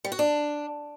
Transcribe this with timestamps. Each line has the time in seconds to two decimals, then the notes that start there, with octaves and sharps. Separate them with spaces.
0.05 G3
0.12 F#4
0.19 D4